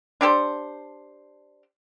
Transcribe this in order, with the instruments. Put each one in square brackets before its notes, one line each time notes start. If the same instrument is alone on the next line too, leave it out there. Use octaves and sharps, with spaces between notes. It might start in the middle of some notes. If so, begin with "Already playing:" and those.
[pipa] D4 G4 A4 C5